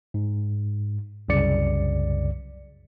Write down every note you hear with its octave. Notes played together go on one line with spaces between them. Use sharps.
G#2
C2 F#2 C#3 D5 C#7